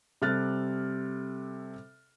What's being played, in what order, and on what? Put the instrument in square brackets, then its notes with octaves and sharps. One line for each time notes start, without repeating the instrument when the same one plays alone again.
[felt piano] C3 G3 A4 F6 F#6 A6